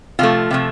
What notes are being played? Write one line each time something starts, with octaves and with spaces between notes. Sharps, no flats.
C3 F3 A3 F4
C3 F3 A3